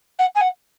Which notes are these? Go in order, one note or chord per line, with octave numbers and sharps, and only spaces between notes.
F#5
G#5
F#5